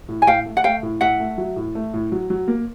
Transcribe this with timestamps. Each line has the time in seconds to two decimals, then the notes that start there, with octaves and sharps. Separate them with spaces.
0.08 A2
0.22 G#5
0.27 A2 F5 G5
0.45 A3
0.57 F#5
0.64 A3 F5 G5
0.83 A2
1.01 A2 E5 F#5
1.20 A3
1.38 F#3
1.56 A2
1.75 A3
1.93 A2
2.12 F#3
2.30 F#3
2.48 A#3